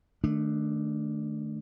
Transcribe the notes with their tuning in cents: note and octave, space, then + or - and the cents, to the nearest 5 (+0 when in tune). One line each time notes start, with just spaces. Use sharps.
D#3 -25 A3 -5 D4 +0